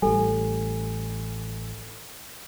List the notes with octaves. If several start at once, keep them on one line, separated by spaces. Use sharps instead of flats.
A1 G3 A4 G#5